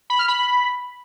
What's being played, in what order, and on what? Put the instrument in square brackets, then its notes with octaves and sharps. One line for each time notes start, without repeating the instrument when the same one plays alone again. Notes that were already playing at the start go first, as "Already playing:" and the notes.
[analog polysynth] B5
F6
B5